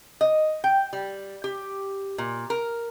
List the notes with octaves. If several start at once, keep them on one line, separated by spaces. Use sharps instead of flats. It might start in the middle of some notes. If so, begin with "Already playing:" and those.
D#5
G5
G3
G4
A#2
A#4